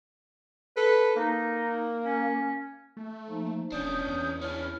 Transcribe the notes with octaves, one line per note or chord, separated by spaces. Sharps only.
A4 B4
A#3 D#4
C#4
A3
F3 A#3 D#4
E1 C#4 D4 D#6 G6
E2
C#4 D4 E4 F6